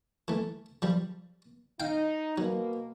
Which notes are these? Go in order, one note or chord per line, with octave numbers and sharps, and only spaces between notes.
E3 A3
F3 G3
D#4 F5 G5
B2 F#3 A#3